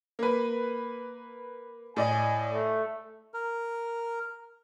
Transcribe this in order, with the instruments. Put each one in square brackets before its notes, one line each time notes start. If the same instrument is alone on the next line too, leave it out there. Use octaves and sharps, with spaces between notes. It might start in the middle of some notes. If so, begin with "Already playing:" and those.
[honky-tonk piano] A#3 B4
[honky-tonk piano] A2 D5 D#5 [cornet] G#5
[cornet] A3
[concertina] A#4